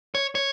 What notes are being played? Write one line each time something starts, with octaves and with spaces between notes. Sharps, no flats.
C#5
C#5